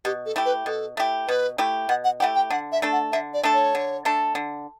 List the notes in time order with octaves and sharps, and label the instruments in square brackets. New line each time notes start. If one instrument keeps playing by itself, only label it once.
[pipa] B2 [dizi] G4
[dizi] A4
[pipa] A3 E4 G4
[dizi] B4
[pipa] B2 [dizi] A4
[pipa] A3 E4 G4
[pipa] B2 [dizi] B4
[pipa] A3 E4 G4
[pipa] B2 [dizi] F#5
[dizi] F#5
[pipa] A3 E4 G4 [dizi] F#5
[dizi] G5
[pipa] D3 [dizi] F#5
[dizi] E5
[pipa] A3 D4 A4
[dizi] F#5
[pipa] D3 [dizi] E5
[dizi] D5
[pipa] A3 D4 A4
[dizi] C#5
[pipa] D3
A3 D4 A4
D3